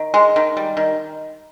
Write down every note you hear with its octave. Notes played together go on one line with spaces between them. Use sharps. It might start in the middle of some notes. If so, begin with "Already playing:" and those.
Already playing: D#3
G#3
D#3
G3
D#3